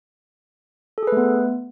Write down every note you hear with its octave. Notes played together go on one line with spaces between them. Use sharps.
A3 B3 G#4 A4 B4